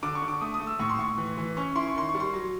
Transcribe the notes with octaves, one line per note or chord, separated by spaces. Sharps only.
D3 D6
C#6
D3
D6
A3 D#6
D#6
A3
E6
A2 C#6
C6
A2 C#6
E3
E3
C#4 C#6
E4 C6
C#6
D#3 C6
C#6
G3
C6
F#3